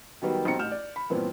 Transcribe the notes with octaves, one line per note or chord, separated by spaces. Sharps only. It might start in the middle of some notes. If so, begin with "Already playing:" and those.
D#3 F#3 G3 B3
B1 G3 C4 A#5 C#7
A1 F6 G6 E7
D5
B5
G2 A#2 E3 B3 C4